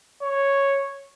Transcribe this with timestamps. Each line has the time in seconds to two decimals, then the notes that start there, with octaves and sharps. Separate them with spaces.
0.22 C#5